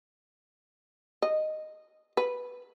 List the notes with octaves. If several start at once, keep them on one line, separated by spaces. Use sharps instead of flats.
D#5
B4